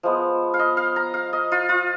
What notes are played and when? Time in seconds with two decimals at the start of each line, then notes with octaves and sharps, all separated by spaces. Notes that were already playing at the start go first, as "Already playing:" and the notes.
0.03 F3 G#3 B3
0.54 F5
0.59 D#5
0.77 F5
0.96 A#5
1.14 F5
1.33 D#5
1.52 F4
1.69 F4